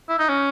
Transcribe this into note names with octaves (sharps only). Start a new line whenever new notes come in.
E4
D#4
C#4